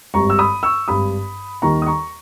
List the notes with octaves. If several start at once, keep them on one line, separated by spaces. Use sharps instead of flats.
G#1 G2 G3 A#5 C#6
E6
B5 D#6
C#6 E6
G#1 G2 G3 B5 D#6
D#2 D#3 G3 A#5 C#6
D#6
A#5 C#6